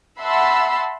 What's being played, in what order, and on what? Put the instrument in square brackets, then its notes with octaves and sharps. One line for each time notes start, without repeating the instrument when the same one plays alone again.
[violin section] E5 F#5 A5 B5 C6 E6